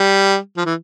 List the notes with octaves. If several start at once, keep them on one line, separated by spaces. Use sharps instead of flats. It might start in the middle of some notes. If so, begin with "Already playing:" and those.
Already playing: G3
F3
E3